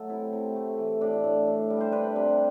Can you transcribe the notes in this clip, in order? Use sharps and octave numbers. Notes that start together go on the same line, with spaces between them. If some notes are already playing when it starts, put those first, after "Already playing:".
Already playing: F#3 A3 A4 A5
C3 E4
C3
A3
E3
A2 D4
A2
D4
G3
C5
D4 B4
C3